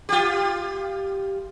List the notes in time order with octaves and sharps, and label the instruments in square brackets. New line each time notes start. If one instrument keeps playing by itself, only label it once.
[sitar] F4 G4